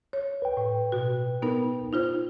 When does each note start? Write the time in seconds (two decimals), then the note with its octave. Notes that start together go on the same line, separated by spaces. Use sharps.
0.13 C#5
0.42 B4 G5
0.57 A2
0.92 B2 F#4
1.42 B3 D#4 A#4
1.93 D#4 F4 C5